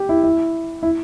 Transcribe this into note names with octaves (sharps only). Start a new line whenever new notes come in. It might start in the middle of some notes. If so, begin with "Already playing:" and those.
Already playing: G4
E4
E4
E4